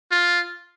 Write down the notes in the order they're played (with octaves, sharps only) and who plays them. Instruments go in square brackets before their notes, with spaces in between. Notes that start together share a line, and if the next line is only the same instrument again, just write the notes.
[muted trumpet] F4